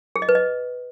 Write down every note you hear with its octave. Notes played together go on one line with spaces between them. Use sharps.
G#4
D#5
B4
D#5